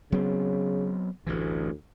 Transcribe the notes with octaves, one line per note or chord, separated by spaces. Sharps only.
C#3 F#3 B3 C4
A1 D2 G2 E3